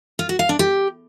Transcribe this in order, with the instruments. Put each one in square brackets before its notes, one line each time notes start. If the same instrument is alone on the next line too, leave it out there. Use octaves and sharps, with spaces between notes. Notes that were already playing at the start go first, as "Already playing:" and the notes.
[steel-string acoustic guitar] F4
F#4
F5
D4
G4